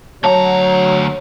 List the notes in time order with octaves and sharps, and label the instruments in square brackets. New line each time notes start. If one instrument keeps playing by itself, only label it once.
[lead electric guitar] D2 A#5 [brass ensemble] F#3 [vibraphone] C#5 [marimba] A5